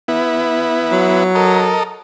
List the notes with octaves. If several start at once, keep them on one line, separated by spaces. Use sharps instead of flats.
B3 E4
F#3
A4 A#4 D#5